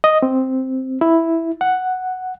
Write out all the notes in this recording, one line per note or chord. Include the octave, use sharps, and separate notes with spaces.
D#5
C4
E4
F#5